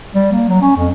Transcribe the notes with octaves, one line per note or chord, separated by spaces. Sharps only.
G3
A#3
F#3
C#4
F2